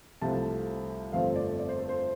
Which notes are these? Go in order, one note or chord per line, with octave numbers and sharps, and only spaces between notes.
C2 C3 F3 A3 A5
G1 F2 F3 A3 C4 F5
D5
D5
C5
A4
C5